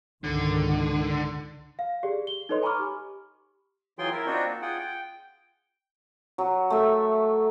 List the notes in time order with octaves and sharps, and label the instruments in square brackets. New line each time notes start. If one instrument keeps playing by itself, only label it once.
[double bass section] C#2 G#2 D#3 [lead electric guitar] D3
[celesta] F5
G4 G#4 D5
G7
D#4 A4 B4 C#5 D#5 C6
G#5 A#5 B5 C#6 D6 F6
G4
[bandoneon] E3 F#3 F4 G#4 G5 C6
E4 A#4
C4 D4 D#4 F4 F#4
A#3
F4 G#4 F#5 G5
G5
[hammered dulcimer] F#3
A3 E5